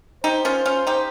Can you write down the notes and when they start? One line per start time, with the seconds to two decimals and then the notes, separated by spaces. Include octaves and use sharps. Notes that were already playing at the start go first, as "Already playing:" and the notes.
0.24 D#4 G4 C5
0.45 C#4 F4
0.66 C#4 F4
0.87 D#4 G4